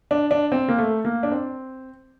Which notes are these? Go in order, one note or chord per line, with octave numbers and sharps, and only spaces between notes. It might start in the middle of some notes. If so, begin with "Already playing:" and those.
D4
D4
C4
A#3
A3
A#3
D4
C4